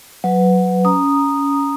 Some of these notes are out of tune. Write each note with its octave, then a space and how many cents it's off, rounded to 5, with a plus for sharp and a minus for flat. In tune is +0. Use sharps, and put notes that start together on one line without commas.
F#3 -5 B4 +15
C#4 +20 A#5 +0 D#6 -10